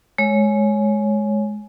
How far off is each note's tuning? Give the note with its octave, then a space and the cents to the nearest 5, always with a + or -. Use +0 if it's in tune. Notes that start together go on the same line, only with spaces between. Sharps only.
G#3 +15 C#5 +0